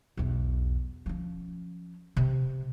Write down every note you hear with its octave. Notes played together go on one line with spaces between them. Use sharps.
B1 E2
F3 C#4
C3